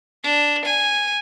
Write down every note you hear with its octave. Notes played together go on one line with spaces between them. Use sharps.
D4
G#5